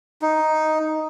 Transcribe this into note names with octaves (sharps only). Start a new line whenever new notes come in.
D#4